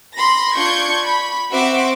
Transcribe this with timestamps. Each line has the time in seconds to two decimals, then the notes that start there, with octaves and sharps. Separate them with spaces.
0.15 B5 C6 A#6
0.57 D4 F4 C#6 G6 G#6
1.07 B5
1.53 C4 F#4 C5 E5 F#5 D6